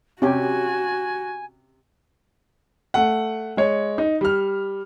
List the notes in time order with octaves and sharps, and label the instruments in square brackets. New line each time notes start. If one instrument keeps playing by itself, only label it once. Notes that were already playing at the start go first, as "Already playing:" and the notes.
[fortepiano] C3 [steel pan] C#4 G4 [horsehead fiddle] F#4 [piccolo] G#5
[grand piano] A3 F#5
G#3 C#5
D#4
G3 F6